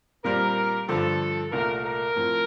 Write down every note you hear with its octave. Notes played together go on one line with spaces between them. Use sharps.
A#2 G3 C4 A#4
G2 D3 F3 A4
C2 A#2 A3 A#4
A#4
A2 F3 C4